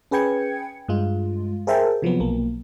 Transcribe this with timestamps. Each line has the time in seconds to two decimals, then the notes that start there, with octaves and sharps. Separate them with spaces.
0.11 C#4 G#4 B4 G5 G#6 C#7
0.88 G2 G#3 F4
1.67 G#4 A#4 C5 E5 G5 A5
2.02 C3 F3 F#3 B3
2.20 B1 A#3